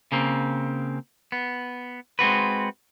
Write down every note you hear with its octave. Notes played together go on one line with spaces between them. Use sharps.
C#3 A#3 C4
B3
G#3 C4 F#4 B4